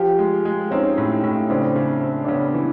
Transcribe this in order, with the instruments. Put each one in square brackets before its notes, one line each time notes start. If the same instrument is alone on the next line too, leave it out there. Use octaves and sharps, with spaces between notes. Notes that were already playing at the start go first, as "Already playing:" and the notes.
Already playing: [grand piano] F3 [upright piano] F4 G4
[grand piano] G#3
G#3
[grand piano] C4 [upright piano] C#4 D#4
[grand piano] A2
A2
[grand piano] C#3 [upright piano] C4 D4
[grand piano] C#3
C4
[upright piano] D4
[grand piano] C#3 [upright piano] B3 C#4
[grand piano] E3